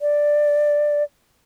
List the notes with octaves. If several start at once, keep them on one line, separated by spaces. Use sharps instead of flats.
D5